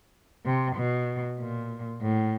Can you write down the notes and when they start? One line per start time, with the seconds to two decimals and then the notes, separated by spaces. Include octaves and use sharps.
0.45 C3
0.76 B2
1.40 A#2
2.02 A2